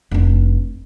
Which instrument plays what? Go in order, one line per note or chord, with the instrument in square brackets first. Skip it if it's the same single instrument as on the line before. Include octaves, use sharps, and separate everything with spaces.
[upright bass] F1 D4